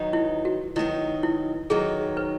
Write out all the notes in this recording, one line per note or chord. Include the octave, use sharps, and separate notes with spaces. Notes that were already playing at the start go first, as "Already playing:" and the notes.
Already playing: D#3 F#3 B3 D#4
E4
F#4
D#3 F#3 B3 D#4 E4
E4
D#3 F#3 B3 D#4 G#4
B4